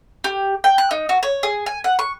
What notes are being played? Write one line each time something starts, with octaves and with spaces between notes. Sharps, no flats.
G4
G5
F#6
D#4
F#4
C#5
G#4
G#5
F#5
C#6